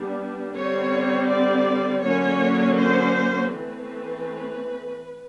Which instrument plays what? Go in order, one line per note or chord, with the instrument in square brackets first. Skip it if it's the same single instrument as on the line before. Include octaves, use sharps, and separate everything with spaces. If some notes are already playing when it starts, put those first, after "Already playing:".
Already playing: [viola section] G3 B3 D4
D3 G3 C4 C#5
D5
D3 F#3 A#3 C#4 C#5
C5
E3 A3 C4 B4